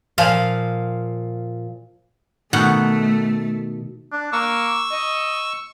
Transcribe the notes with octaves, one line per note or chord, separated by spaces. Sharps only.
A#2 F3 F5
B2 D#3 A3 F#5
D4
A#3 C#6 E6
D#5